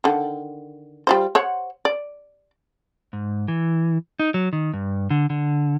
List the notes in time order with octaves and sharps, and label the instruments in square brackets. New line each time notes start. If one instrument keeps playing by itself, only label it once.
[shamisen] D3 D#3
G3 F4 C5
C5 C#5 F#5
D5
[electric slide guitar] G#2
E3
D#4
F#3
D#3
G2
D3
D3